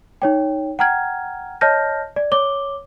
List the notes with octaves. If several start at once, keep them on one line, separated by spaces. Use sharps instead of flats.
D#4 C#5 G5
F#5 G5 A#5 F6 G#6
C#5 D#5 A5 F6 G6 A#6
D5
C#5 D6 G7